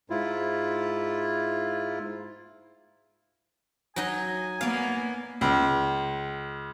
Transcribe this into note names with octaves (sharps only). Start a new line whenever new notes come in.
G#2 E4 F4
F#3 D#4 D#5 G#5
A#3 B3 D5 F5
C#2